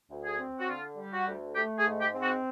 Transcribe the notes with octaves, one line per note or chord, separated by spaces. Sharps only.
D2
G#4
C4
F#4
D3 F4
G3
F#4
D2
A3 G4
G#4
G#2
G4
C4
F#4